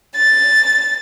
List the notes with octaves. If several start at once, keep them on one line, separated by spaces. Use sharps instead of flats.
A6